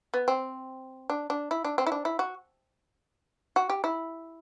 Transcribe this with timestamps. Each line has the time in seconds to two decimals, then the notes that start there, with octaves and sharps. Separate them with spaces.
0.14 B3
0.28 C4
1.10 D4
1.30 D4
1.51 E4
1.65 D4
1.78 C4
1.87 E4
1.92 D4
2.05 E4
2.19 F#4
3.56 F#4
3.70 G4
3.84 E4